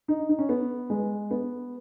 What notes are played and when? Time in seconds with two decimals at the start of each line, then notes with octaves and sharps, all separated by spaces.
0.08 D#4
0.29 D#4
0.39 C#4
0.49 B3
0.90 G#3
1.31 B3